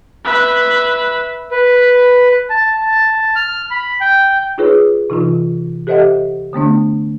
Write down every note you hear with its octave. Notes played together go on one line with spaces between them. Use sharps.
B4 E5
B4
A5
F6
B5
G5
D#4 F4 G#4 B4 C#5
C3 E3 D#4 F4
G4 A4 C5 D#5 E5 F#5
D3 A3 B3 D4